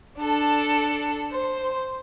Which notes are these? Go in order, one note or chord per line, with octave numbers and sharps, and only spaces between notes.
D4 A4
C5